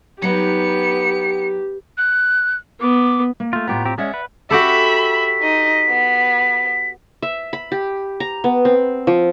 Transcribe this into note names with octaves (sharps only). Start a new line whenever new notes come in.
F#3 B3 D#4 G4 C#7
F#6
B3 D6
A#3
A3 F4
A2 B3 F4 G4 A#5
C4 G4
G#3 C#4 D5 E5 F#5
B4
F#4 G4 A4 E5 B5
B6
D#4 D#5
B3
E5
B5
G4
A#5
B3
C4
F3